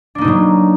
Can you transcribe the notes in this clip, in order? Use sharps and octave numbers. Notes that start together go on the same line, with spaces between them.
B2 F#3 A#3 D4 D#4